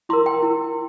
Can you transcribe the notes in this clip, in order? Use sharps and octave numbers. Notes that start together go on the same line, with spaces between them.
E4 A#4 C6
G5
E4 A#4